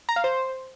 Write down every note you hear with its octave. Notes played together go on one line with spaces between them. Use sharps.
A#5
F5
C5